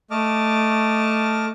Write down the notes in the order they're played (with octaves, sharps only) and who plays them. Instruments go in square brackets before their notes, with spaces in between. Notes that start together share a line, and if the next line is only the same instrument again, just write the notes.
[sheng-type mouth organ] A3 D#5 A5 D6 F6